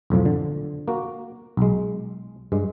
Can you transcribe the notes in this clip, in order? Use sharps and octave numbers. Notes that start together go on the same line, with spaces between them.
B1 F2 A2 F3
D3
A#3 F#4
B1 G#3
G2 G#3